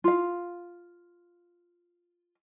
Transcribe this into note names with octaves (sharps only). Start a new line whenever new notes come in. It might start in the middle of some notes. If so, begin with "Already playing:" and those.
F4 F5